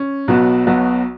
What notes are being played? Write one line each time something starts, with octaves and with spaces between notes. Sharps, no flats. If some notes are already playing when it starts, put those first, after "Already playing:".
Already playing: C#4
B1 B2 F#3 B3 F#4
B1 B2 F#3 B3 F#4